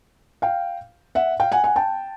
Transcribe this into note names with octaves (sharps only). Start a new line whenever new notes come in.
F5 G5
E5 F#5
F5 G5
F#5 G#5
F#5 G#5
G5 A5